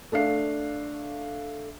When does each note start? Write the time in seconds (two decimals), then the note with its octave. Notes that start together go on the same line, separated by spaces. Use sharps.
0.12 A3 D4 F5 C7